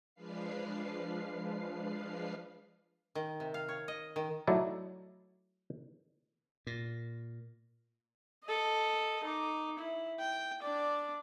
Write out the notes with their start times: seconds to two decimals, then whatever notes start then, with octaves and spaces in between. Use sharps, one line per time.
0.15 F3 G#3 D4 B4 F5 C7
3.15 D#3
3.40 C3
3.54 F5
3.69 C#5
3.88 D#5
4.16 D#3
4.47 F#3 A3 D#4 E4 D5
6.67 A#2
8.45 A4 D#5
9.24 D#4 D6
9.79 E4
10.20 G5
10.62 D4 D5